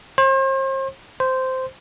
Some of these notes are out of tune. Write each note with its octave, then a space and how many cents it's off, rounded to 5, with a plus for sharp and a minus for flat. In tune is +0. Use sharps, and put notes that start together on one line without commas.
C5 +40
C5 -10